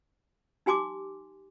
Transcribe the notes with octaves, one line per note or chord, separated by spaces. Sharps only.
D#4 G4 G#5 C6 D6